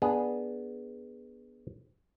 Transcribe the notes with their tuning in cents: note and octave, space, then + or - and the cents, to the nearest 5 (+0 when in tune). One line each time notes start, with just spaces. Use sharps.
B3 -10 D4 +5 G#4 +0